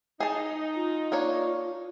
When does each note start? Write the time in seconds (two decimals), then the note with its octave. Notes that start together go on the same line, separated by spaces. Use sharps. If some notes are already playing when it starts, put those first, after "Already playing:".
0.20 D#4 G#4 A5
0.75 F4
1.12 A#3 D4 C#5